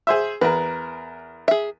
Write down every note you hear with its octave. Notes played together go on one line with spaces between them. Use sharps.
G#4 C5 E5
E2 A#4 B4
G#4 E5